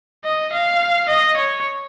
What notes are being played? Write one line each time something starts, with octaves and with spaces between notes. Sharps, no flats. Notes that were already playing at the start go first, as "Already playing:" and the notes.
D#5
F5
D#5
C#5